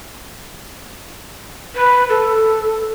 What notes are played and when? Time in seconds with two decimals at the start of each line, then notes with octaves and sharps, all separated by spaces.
1.75 B4
2.09 A4